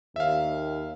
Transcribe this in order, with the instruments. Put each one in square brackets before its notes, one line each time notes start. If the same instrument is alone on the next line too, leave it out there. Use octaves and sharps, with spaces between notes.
[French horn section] D#2 [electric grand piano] E5 F5